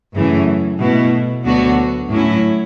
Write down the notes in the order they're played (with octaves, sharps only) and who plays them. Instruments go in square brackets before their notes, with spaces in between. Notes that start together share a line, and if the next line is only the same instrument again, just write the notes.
[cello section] F#2 C#3 E3 A3
B2 A3 E4
D2 D3 F#3 B3 F#4
A2 F#3 C#4 E4